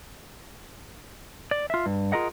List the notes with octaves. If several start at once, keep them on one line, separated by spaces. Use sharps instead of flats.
D5
F4 E5
G2
F4 G#4 A#4 D#5 F#5